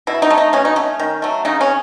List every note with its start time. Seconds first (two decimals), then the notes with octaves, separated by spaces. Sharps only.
0.07 B2 E4
0.22 D#4
0.30 A3
0.38 D#4
0.53 B2 C#4
0.65 D#4
0.76 A3 C#4
0.99 D#3
1.22 F#3 A3
1.45 C#3 D#4
1.61 C#4